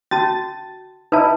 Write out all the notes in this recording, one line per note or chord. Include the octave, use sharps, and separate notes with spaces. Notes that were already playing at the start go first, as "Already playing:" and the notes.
C#4 F#4 A5 A6
D#4 E4 B4 A5